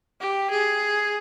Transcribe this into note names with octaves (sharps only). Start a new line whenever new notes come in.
G4
G#4